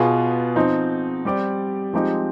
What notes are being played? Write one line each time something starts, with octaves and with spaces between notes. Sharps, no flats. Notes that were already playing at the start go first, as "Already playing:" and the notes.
Already playing: B2 B3 F4 G#4
F3 C4 D#4
G3 C4 G4 D5
F3 G#3 C4 D#4 G4